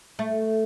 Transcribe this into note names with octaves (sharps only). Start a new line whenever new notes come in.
A3